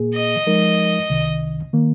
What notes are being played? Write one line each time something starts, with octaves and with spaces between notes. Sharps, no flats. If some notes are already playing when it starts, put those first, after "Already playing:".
Already playing: A#2 A#3 G#4
D#5
F3 G#3 D#4 A#4
C2 C3 D#3
D#3 A#3